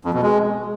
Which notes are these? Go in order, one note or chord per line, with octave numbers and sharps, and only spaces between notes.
F2
B2
G#3